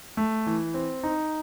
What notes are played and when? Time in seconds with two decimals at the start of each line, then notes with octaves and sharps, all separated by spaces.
0.17 A3
0.47 E3
0.74 C4
1.03 D#4